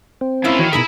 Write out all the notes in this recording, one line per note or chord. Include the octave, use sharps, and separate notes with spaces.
C4
C#3 A#3 E4 F4 E5
D#3 E3 F#4 C#5
B2 D#3 D#4 E4 G#4 A#4 E5 B5